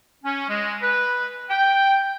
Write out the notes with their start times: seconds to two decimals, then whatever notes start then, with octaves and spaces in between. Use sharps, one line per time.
0.24 C#4
0.48 G#3
0.82 B4
1.49 G5